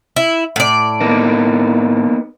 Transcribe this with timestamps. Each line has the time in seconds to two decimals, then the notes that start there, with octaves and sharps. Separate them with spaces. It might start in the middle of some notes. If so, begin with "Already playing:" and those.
0.16 E4
0.56 A2 D5
1.01 A#3 B3 D#4